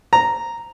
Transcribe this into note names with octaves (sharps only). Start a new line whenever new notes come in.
A#5